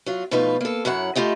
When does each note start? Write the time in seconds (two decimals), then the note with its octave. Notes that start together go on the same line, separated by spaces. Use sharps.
0.06 F#3 F4
0.31 B2 F3 A3 D#4 F4 B4
0.61 A#3 A4
0.85 F#2 F#3 E4 F#5
1.15 A3 E4 F4 G4 D#5